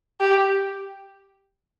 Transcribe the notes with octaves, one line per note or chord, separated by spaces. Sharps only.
G4